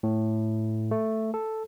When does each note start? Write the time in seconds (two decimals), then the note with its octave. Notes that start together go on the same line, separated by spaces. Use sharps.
0.03 A2
0.91 A3
1.34 A4